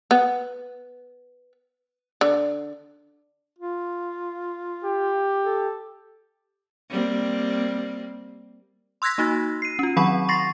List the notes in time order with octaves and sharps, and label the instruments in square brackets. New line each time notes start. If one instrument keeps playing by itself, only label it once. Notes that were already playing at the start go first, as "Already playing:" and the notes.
[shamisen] B3
D3
[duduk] F4
[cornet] G4
[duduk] A4
[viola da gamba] G3 A#3 C4
[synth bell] C6 E6 F#6 G#6 A#6 B6
A#3 D#4 F#4
C7 D#7
C#4 F4
D#3 F#3 C4 F#5 B5 C#6
C6 C#6 A6 A#6 C7